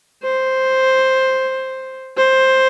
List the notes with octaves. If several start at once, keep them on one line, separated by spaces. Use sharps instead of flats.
C5
C5